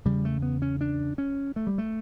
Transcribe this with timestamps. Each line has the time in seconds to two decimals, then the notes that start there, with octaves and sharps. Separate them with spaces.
0.05 E2 C#3 G3
0.25 A3
0.42 B3
0.62 C#4
0.81 D4
1.18 C#4
1.56 A3
1.67 G3
1.78 A3